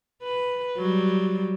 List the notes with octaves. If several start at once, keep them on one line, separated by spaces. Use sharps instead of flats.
B4
F#3 G3